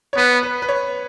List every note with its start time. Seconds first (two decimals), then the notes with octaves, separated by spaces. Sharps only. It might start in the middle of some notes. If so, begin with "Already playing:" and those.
0.13 C#5
0.17 B3 B4
0.43 B4
0.62 B4
0.69 C#5